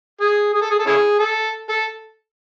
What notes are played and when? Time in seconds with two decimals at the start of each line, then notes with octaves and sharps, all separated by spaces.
0.20 G#4
0.54 G#4
0.61 A4
0.71 G#4
0.79 A4
0.86 C#4 E4 G#4
1.19 A4
1.69 A4